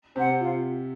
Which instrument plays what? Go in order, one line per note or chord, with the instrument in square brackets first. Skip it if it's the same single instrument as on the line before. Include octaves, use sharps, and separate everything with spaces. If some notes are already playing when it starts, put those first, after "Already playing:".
[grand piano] C3 [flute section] C5
[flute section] F#5
F4